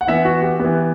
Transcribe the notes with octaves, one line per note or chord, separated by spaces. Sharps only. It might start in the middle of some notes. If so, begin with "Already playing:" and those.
F#5
E3 B3 E5
F#4
G4
E3 B3